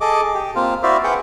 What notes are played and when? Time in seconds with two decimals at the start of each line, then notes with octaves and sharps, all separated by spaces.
0.01 G#4 A4 D#5 D6
0.34 G4
0.55 A#3 C4 F4 F5
0.83 E4 F#4 C5 D5 E5 F5
1.04 G#4 B4 F#5 G5